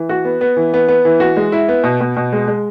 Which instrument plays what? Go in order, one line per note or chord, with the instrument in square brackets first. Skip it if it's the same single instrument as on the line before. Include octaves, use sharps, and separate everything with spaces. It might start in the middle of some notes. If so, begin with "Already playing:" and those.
Already playing: [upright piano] E3
F#4
B3
B3
E3
B3
B3
E3
F#4
G#3
E4
B3
B2
B2
B2
G#3
G#3